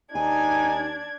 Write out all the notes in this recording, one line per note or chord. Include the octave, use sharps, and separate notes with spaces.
D#2 D4 D#4 G#5 G#6